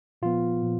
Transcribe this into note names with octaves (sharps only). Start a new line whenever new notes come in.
A#2 F3 B3 F4
A#2 F3